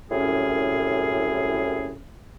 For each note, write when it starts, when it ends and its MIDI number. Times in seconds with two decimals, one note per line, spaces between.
0.11 1.96 36
0.11 1.96 42
0.11 1.96 45
0.11 1.96 61
0.11 1.96 68